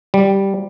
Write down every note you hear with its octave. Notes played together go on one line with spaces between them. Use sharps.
G3